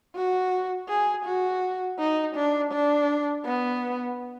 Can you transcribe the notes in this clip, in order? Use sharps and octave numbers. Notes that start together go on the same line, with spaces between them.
F#4
G#4
F#4
D#4
D4
D4
B3